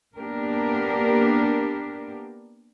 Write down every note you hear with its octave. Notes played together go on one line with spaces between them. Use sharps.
A#3 B3 D4 G4 A#4